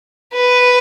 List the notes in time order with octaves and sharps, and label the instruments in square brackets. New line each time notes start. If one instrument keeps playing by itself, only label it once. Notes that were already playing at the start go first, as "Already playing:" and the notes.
[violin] B4